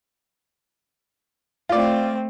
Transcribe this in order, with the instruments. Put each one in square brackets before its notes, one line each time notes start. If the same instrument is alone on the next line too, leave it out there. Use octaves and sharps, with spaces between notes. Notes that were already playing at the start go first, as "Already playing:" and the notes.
[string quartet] A3 C4 [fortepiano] F4 D5